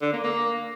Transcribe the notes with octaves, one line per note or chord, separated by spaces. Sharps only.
D3
A#3
A#3